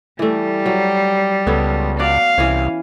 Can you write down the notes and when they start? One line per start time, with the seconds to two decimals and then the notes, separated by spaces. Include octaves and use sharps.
0.19 E3 G3 A3
0.66 F#3
1.47 C#2 B3 A4 C#5
1.99 F#4 D5 F5
2.38 C2 E3 C#4